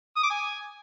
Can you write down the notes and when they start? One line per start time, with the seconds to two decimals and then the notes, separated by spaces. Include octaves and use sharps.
0.16 D#6
0.23 D6
0.30 G#5